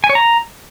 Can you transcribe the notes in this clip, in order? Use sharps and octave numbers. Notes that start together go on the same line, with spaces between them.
G#5
C#5
A#5